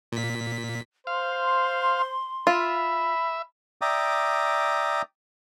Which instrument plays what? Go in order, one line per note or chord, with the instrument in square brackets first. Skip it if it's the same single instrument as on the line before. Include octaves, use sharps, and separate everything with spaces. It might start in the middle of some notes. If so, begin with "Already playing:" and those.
[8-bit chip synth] A#2 B6
[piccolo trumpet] C5 [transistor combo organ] F5 [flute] C6
[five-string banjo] F4 [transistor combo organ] E5 [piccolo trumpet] B5
[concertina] D5 E5 G5 A#5 D6 D#6